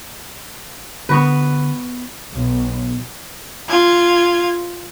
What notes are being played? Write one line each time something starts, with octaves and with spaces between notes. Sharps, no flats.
D3 B3 F#4 B4
B1
F4 G#6